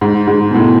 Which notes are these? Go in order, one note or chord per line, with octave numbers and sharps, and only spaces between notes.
G#2
G#2
B2
A2